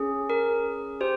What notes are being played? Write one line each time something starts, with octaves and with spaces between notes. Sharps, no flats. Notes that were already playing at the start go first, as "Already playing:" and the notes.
Already playing: C#4 G#4
A#4
G4 C5